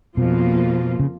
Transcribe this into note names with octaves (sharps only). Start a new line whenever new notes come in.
F2 B2 F3 A#3 F4
C#3